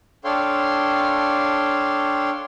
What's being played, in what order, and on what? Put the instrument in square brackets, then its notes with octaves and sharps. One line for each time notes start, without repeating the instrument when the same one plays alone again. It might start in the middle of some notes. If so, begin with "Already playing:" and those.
[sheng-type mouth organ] D4 A4 C#5 F5 G5 C6